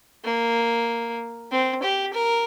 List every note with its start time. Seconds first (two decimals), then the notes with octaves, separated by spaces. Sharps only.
0.25 A#3
1.51 C4
1.83 G4
2.14 A#4